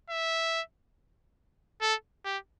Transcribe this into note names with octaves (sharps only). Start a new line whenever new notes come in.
E5
A4
G4